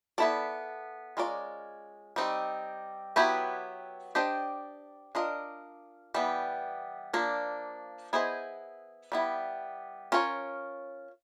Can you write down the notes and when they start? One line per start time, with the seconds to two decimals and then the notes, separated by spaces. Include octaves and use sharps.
0.18 B3 E4 A4 D5
1.17 G#3 C#4 F4 A#4 D5
2.16 G3 C4 D#4
3.16 F#3 B3 E4 G4 B4
4.15 D4 G4 C5 D#5
5.15 D4 F4 A#4 D#5
6.14 E3 G3 B3
7.14 F3 A#3 D4
8.13 B3 E4 G#4 C5 D#5
9.12 G3 B3 E4
10.12 C#4 F4 A#4 C#5